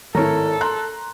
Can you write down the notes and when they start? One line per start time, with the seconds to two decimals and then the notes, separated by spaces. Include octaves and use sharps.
0.15 G#1 A2 A4 A#4 C#5
0.61 A#5 C6 F#6